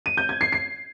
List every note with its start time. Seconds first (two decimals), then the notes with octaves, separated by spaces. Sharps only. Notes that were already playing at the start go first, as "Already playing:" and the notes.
0.06 D#7
0.17 G6
0.29 G#6
0.41 C7
0.52 C7